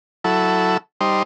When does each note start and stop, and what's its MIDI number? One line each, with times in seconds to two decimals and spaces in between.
0.24 0.77 54
0.24 0.77 64
0.24 0.77 69
1.01 1.23 55
1.01 1.23 63
1.01 1.23 72